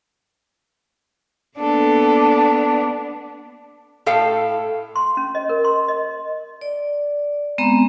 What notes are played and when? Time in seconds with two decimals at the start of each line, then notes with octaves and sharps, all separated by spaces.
1.58 A#3 B3 D4 A4
4.06 A2 A4 F5 G5
4.96 C6
5.17 C#4
5.35 D#5
5.49 A#4
5.65 C6
5.88 D#5
6.61 D5
7.58 G#3 B3 C4 A#5 C6